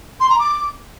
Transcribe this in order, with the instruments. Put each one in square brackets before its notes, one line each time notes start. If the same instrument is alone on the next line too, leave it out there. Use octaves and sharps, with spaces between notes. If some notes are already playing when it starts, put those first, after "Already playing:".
[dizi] C6
A#5
D6